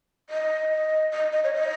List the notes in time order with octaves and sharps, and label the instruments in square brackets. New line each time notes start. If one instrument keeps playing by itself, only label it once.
[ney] D#5
D#5
D#5
D#5
C#5
D#5